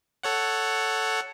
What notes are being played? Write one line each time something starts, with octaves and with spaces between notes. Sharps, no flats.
A4 C#5 F#5